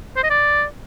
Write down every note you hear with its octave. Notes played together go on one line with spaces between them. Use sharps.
C5
D#5
D5